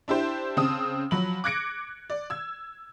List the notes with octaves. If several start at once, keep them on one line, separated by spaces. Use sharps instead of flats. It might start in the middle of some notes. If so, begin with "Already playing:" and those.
D4 E4 G4 C5
C#3 C4 A5 D#6
F3 F#3 B5 F#7
D6 F#6 G#6 A#6 C#7 D7
D5
E6 G#6